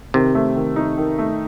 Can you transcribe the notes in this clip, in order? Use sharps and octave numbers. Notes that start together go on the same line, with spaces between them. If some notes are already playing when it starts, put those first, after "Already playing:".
C3 D#3
A3
D#3
D#4
D#3
A3